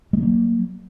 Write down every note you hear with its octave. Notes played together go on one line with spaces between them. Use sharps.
F#3 G#3 A#3